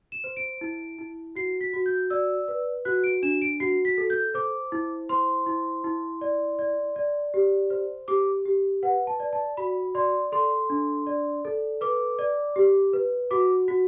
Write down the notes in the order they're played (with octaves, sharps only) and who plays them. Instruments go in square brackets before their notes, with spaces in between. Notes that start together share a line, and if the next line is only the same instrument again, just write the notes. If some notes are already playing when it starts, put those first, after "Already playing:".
[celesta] E7
C5
D7
E4
E4
F#4 C7
B6
F#4
G6
D5 E6
B4
F#4 F#6
D7
D4 E7
D7
F#4 C7
B6
A4
G6
C5 D6
E4
C5 C6
E4
E4
D5
D5
D5
G4
C5
G4 D6
G4
B4 F#5
A5
D5
A5
F#4 B5
D5 C6
A4 C6
D4
D5
A4
B4 D6
D5
G4
B4
F#4 D6
F#4